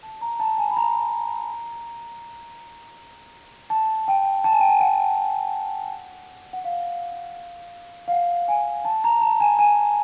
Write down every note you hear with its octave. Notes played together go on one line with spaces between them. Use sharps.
A5
A#5
A5
G#5
B5
A#5
A5
G5
A5
G#5
G5
G#5
F#5
F#5
F5
F5
F#5
G#5
A5
A#5
A5
G#5
G#5